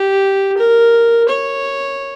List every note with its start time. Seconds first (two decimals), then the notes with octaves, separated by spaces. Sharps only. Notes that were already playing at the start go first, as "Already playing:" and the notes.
Already playing: G4
0.57 A#4
1.29 C#5